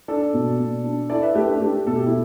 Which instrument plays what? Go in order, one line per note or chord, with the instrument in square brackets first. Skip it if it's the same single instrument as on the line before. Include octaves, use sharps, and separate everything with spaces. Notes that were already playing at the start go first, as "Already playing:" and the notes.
[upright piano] D4 [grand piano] A4 D5
[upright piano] B2
B2
D4
[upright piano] E4 [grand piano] A4 D5
[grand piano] B4 E5
[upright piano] A3 [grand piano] G4 B4
[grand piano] D4
[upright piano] A3 [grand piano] D4 G4
[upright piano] B2 [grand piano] A4
[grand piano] G4
E4